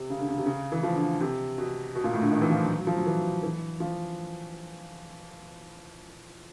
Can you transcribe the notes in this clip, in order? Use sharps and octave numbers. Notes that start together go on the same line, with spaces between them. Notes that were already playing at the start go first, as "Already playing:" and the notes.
Already playing: C3
C#3
D3
C#3
C3
C#3
E3
F3
D3
C3
B2
B2
A#2
A2
D3
D#3
E3
F3
F#3
F#3
F3
F#3
E3
E3
F3